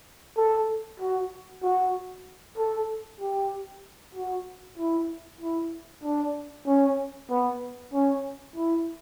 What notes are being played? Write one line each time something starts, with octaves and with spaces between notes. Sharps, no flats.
A4
F#4
F#4
A4
G4
F#4
E4
E4
D4
C#4
B3
C#4
E4